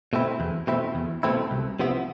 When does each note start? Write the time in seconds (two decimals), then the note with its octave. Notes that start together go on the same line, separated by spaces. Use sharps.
0.13 B2 A3 C4 E4
0.40 E2
0.67 B2 A3 C4 E4
0.95 E2
1.23 B2 A3 C4 E4
1.51 C2
1.79 C3 F3 B3 E4